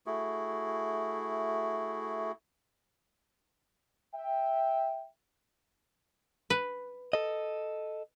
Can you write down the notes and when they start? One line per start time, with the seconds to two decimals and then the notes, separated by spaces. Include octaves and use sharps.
0.06 A3 E4 F#4 G#4
4.14 E5 G5
6.50 B4
7.13 A4 D#5